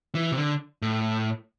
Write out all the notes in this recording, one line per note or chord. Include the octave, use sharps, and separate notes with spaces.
E3
C3
D3
A2